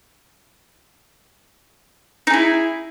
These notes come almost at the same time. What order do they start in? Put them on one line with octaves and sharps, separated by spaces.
D#4 G#4 E4